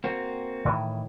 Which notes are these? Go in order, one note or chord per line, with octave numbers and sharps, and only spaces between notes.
A#3 C4 F#4
A2 D#3 E3